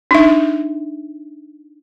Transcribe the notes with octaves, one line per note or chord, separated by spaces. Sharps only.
D4 D#4 E5